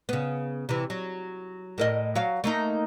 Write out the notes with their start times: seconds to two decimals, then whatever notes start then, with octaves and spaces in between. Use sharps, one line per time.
0.09 C#3 B3
0.69 C3 E3
0.90 F#3
1.78 A2 A#4 D#5
2.16 F#3 F5
2.44 A3 A#3 D#4